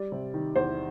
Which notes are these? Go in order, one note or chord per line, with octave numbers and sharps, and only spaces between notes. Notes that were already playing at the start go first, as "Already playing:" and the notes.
Already playing: G3 D5
C3
D#3
E2 C5